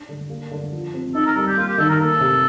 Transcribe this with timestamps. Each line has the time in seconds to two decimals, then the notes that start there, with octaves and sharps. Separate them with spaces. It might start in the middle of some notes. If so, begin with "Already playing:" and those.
Already playing: D4
0.09 D3
0.30 A#3
0.51 D3
0.72 F3
0.94 C4
1.15 D#4 A4
1.26 A#4
1.36 G3 A4
1.47 G4
1.57 A#3 F4
1.68 G4
1.78 D#3 A4
1.89 A#4
2.00 A#3 A4
2.20 C3